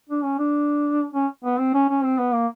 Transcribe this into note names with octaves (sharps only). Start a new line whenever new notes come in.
D4
C#4
D4
C#4
B3
C4
C#4
C#4
C4
B3
A#3